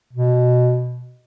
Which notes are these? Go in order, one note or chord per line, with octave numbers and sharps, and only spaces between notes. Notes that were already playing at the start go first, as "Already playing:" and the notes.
B2